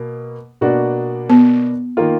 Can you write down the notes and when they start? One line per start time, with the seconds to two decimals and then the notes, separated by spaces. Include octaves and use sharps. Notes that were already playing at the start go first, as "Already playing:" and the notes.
Already playing: B2 A#3
0.61 B2 A#3 D4 F#4
1.30 B3
1.97 D#3 A#3 F4